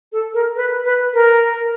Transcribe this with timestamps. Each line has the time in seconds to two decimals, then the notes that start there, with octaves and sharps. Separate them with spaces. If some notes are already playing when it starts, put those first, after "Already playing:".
0.12 A4
0.34 A#4
0.56 B4
0.85 B4
1.14 A#4